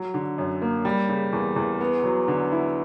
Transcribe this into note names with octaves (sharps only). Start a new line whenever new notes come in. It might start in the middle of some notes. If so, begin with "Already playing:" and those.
Already playing: F#3
D3
F#2
A#3
G3
C#3
E2
E2
B3
F#3
D3
E4